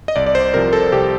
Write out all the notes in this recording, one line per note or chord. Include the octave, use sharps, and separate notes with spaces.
D#5
C2 D5
D5
C5
C3 F3 A#4
A4
C2 G4